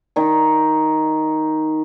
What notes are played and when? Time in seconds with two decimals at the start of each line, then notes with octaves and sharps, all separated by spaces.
0.16 D#3 D#4